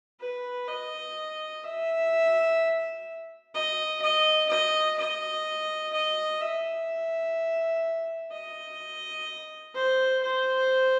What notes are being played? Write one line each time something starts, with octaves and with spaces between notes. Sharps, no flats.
B4
D#5
E5
D#5
D#5
D#5
D#5
D#5
E5
D#5
C5
C5